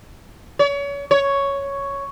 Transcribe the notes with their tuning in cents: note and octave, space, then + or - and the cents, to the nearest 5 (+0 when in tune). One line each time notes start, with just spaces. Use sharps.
C#5 +35
C#5 +5